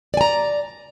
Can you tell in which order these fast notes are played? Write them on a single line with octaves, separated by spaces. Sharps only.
D5 G#5 A#5